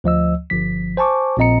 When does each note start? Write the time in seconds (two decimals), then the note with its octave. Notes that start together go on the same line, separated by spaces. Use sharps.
0.04 D2 F3 D#5 E6
0.50 G1 F3 B6
0.97 C5 G#5 A5 C#6 D6
1.37 A#1 A#2 C4 D#5 A#5 C#7